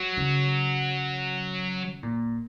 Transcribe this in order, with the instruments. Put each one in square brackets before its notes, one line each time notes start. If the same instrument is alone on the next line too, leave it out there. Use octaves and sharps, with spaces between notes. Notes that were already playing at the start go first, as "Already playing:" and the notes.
Already playing: [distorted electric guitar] F#3
[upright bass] C#3
A#2